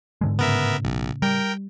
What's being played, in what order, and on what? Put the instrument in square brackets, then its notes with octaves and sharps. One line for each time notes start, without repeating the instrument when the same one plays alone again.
[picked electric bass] G#2 D3 G#3
[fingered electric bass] A2 C#3 [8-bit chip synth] B3 A#4 E5
[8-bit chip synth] B1
[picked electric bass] G3 [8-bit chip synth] A#4 G5